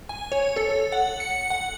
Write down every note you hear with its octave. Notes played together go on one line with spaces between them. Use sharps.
G#5
C#5
A4
F#5
C#7
F#5